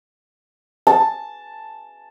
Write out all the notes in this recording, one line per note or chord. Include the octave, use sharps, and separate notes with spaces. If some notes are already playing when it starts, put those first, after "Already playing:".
A5